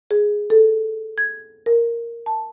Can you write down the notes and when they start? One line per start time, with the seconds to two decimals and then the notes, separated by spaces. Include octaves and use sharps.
0.11 G#4
0.50 A4
1.18 G#6
1.66 A#4
2.26 A5